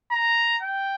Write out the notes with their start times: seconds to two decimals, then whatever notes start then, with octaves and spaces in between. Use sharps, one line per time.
0.12 A#5
0.62 G5